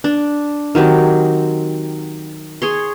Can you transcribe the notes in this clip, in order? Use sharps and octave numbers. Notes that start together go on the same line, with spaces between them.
D4
D#3 F#3 C4 G4
G#4 C#5 C6